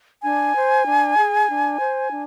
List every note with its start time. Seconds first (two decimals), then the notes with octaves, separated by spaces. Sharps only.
0.24 D4 G#5
0.55 C5
0.86 D4
1.18 G#4
1.48 D4
1.80 C5
2.11 D4